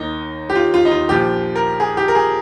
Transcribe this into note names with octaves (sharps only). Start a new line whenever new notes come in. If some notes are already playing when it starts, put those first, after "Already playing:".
Already playing: D#2 D#3 D#4
G4
F4
F4
D#4
F4
A#1 A#2 F3 G4
A#4
G#4
G4
A#4
G#4